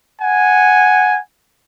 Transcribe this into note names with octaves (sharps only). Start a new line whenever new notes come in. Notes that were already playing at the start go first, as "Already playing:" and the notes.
F#5 G#5